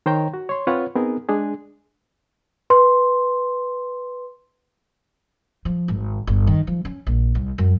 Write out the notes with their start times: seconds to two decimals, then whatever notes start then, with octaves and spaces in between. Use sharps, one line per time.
0.06 D#3 C5 C#5 G5 A#5
0.34 F#4
0.49 C#5 C6
0.67 C4 F4 B4 C#5 F#5
0.95 B3 C4 D#4 G#4 A#4
1.29 G#3 D4 G#4
2.70 B4 C6
5.65 F3
5.88 G#1
6.27 G1
6.47 D#3
6.67 F3
6.85 C#4
7.07 A#1
7.35 C2
7.58 F#2